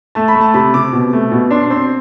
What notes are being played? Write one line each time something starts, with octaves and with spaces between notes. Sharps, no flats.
A3 A5
B5
A3
A5
C3 B5
C3 D6
B2
A3
B2
D4 C6
C4 C6